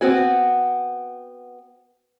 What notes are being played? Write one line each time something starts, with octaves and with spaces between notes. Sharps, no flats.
B3 C4 F#4 G#5